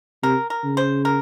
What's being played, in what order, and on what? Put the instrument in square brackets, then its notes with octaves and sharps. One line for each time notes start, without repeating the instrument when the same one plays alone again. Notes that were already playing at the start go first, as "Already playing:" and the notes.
[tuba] C3 [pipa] A#4
[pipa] A#4
[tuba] C#3
[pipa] C5
A#4